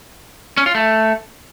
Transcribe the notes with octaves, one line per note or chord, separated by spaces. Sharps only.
C#4
F4
A3